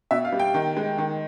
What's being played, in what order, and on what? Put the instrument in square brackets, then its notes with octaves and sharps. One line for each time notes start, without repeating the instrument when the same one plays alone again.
[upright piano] B2 E5
F5
G3
G5
D#3
G#3
D#3